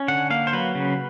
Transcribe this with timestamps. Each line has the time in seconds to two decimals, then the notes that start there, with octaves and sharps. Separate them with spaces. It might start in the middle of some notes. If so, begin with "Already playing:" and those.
Already playing: C#4
0.08 D3 F#5
0.30 A#3 F5
0.47 C5
0.53 F#3 B4
0.75 C#3